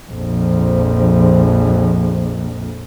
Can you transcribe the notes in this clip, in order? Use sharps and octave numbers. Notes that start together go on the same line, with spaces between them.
A#1 F2